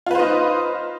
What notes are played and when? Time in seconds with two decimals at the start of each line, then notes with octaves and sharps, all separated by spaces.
0.06 F4
0.11 B4
0.15 C5
0.19 D#4